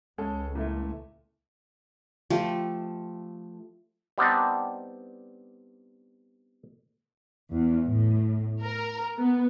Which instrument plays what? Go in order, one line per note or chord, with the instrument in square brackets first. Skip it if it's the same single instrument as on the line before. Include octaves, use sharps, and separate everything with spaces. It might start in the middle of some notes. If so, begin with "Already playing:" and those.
[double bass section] C#2 [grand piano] G#3 C#4 A4
[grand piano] A#2 E3 A3
[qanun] F3 A3 G4 A4
[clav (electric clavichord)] G3 B3 C4 D4 D#4
[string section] E2
A2
A#4
B3